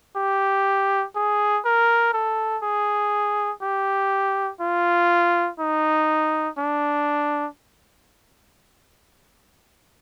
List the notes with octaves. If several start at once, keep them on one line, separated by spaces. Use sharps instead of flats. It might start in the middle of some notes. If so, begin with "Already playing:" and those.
G4
G#4
A#4
A4
G#4
G4
F4
D#4
D4